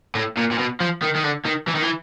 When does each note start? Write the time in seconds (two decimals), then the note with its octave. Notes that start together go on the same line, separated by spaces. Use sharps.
0.15 A2
0.37 A#2
0.51 A#2
0.59 B2
0.80 F3
1.02 D#3
1.16 D#3
1.24 D3
1.46 D#3
1.68 E3
1.75 D#3
1.82 E3